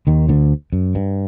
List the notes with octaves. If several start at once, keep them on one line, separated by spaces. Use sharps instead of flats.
D#2 D#3
D2 D3
F#2
G2